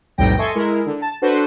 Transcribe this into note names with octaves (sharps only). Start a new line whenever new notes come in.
B1 F2 A2 G3 G5 A#6
A4 D#5 E5 G#5 C6 C#6
G#3 E4 A#4
D3
A5
D4 F#4 A4 B4 C5